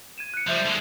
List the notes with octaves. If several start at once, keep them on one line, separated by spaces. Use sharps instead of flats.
G#6 D#7 E7
F#6 C#7
F3 G3 C5 E5 G6
D3 G#3 F7 G7